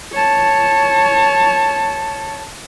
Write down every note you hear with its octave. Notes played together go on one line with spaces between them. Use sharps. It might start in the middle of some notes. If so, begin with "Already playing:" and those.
C#5 A5